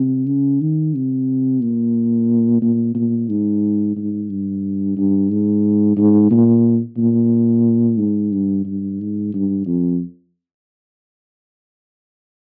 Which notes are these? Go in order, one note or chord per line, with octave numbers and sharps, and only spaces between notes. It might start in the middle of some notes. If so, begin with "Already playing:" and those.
Already playing: C3
C#3
D#3
C3
A#2
A#2
A#2
G#2
G#2
G2
G2
G#2
G#2
A#2
A#2
G#2
G2
G2
G#2
G2
F2